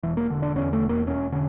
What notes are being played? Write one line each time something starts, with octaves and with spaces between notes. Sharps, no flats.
E1 E3
A#3
D3
D4
E2 C#4
A3
E1
A#3
E1 C#4
D3 C#4